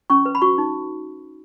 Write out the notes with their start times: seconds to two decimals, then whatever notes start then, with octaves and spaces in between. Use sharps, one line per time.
0.10 C#4 C#6
0.25 B4
0.35 B5
0.41 F#4 C#6
0.58 D#4